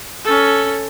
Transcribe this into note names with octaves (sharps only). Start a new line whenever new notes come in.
C#4 A4